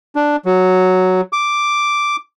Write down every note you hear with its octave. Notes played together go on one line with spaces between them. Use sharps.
D4
F#3
D6